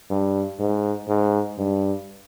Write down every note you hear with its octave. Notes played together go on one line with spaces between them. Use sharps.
G2
G#2
G#2
G2